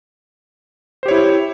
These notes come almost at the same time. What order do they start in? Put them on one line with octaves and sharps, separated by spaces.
C5 G4 C#5 E4